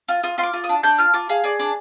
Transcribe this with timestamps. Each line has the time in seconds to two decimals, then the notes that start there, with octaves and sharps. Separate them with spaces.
0.09 F4
0.23 F4 D#6
0.38 F4 C6
0.43 D6
0.53 F4
0.64 D#6
0.69 D4
0.83 D4 G6
0.98 F4 F6
1.14 F4 D6
1.29 G#4 F5
1.44 G#4 D5
1.59 D4 D5